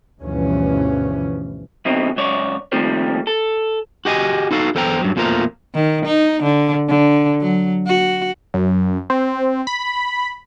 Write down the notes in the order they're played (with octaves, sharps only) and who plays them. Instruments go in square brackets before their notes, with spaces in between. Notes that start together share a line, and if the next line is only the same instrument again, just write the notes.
[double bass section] D2 G2 B2 E3 F3 C#4
[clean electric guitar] F#2 B2 D3 C4 D#4
C#2 F#2 C#5 D5
D#3 F3 G3 A3 A#3 C4
A4
F#4 G4 D#5 G#5
D#4 F#4 A4 F5
E2 A4 C5 G5 A#5
G2 F#3
F2 B2 F3 A3 A#3 A#5
[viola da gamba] D#3
D#4
D3
D3
F#3
F#4
[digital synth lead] F#2
C4
B5